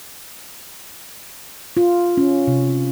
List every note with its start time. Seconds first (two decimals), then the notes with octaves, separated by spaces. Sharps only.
1.77 F4
2.17 C#4
2.47 C3